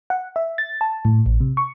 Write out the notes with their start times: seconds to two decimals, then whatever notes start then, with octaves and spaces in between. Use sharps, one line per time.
0.10 F#5
0.36 E5
0.58 A6
0.81 A5
1.05 A2
1.26 A1
1.40 C3
1.57 C#6